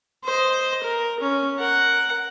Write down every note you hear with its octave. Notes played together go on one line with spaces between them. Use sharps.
C5 D#5
A#4
C#4
A#4 F#5